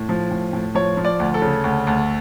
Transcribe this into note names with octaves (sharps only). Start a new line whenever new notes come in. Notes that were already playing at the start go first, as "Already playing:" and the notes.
Already playing: A2
F3
A2
A2
F3 C#5
F3
D5
D2
A4
C#3
D2
D2